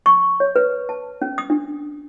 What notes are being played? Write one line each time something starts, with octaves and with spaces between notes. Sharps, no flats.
C#6
C#5
B4
A5
C#4
D#6
D4